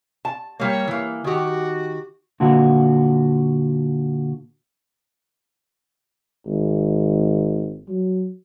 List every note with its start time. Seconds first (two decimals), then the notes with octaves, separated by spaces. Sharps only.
0.25 A5
0.60 G3 A#3 C#5
0.87 E3 A#3
1.24 D#3 F#4 G4
2.40 A#2 D3 F#4
6.46 G#1
7.88 F#3